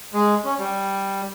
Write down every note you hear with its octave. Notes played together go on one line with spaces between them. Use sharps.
G#3
C#4
G3